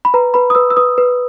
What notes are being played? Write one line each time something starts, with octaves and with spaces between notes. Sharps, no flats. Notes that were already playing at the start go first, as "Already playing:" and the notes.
B5
B4 A#5
B4 B5
D#6
B4 E6
E6
B4 D#6
B4